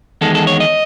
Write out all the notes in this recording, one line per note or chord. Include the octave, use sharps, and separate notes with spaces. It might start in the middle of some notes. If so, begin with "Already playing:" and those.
E2 D#3 G#3 A4
A4
C#5
D#5